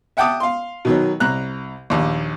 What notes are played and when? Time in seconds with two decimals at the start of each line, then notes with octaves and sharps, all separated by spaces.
0.17 E5 F#5 G5 A5 D6 D#6
0.40 F5 C6
0.85 B2 D#3 F#3
1.20 C2 A#5 F#6
1.90 A#1 D#2